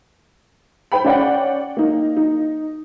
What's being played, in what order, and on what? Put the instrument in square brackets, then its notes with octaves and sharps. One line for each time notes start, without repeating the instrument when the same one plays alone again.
[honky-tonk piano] C5 G5 B5
C#4 D5 F#5 G5
A#3 D#4
D#4